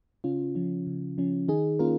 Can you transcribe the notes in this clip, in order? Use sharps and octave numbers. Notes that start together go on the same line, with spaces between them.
C#3 C#4 F4
F3 C#4
C#3
F3 C#4
D#3 D#4 G#4
A#3 C#4 F4 A#4